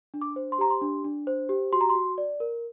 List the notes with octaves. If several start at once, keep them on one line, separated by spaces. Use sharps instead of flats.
D4
D6
C5
C6
G4 A#5
C6
D4
D4
C5
G4
F#4 C6
A#5
C6
F#4
D5
A#4